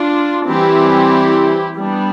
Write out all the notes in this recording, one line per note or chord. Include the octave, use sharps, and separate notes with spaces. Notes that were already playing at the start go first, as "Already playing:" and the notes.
Already playing: D4 F4
E3 G3 C4 E4 G4
G3 B3 D4